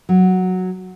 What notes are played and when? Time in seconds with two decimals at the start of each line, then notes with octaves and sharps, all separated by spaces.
0.09 F#3